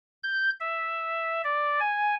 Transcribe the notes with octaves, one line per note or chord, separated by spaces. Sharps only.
G6
E5
D5
G#5